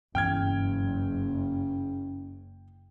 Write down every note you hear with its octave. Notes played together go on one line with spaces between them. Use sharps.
F#1 G2 C#3 E3 B3 G5 F6 G#6